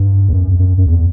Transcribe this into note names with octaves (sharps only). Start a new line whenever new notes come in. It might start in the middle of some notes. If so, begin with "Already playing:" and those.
Already playing: G2
E2
F#2
F#2
F#2
E2